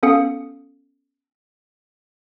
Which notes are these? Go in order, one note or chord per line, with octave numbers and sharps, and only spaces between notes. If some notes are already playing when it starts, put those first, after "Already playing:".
B3 C#4 A4 F5 D#6 C#7